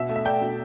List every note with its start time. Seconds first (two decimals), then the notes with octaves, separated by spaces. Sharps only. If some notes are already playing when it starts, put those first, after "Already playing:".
Already playing: B2 E5
0.09 A3
0.16 E5
0.25 A3 D5 G5
0.41 B2